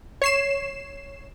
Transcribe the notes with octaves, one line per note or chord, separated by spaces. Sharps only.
C#5 C7 E7